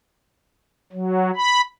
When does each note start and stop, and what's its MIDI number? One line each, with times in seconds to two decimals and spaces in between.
0.92 1.31 54
1.36 1.61 83